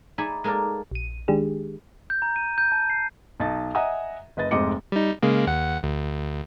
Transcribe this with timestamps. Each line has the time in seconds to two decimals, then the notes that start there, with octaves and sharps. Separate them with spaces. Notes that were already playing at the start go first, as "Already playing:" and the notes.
0.18 D#4 G#4 D5 E5 G#5 B5
0.44 G#3 A#3 A4 A#4 D5
0.91 A#1 D#7
1.28 D#3 G#3 D4 G4 G#4
2.10 G6
2.22 A#5
2.36 D#7
2.58 G6
2.72 A5
2.90 C7
3.40 B1 D#4 A5 A6
3.75 D#5 E5 F#5 G#5 A#5 D#6
4.37 F#1 B4 D#5 A6
4.51 F1 G#2 C4 D#5 D6 C#7
4.92 G3 D#4
5.23 C#3 G#3 A#3
5.47 D#2 F#5
5.83 D2